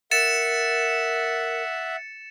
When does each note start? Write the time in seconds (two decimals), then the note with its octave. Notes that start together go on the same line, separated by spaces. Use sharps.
0.11 A#4 E5 F#5 A6 C#7 E7